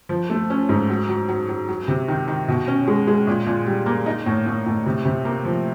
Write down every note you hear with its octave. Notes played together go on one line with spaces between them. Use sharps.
F3
A3
C#4
G#2
F#3
F#3
F#3
F#3
F#3
C3
D#3
D#3
B2
C#4
G#3
G#3
A#2
A#2
G3
A#3
D#4
A2
A2
A2
C3
C3
A#3
F3